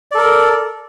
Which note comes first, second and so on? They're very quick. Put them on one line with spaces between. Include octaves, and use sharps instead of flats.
D5 A4 A#4